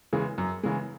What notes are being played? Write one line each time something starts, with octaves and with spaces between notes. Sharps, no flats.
C#3 E3 G#3
F#2
C#3 E3 G#3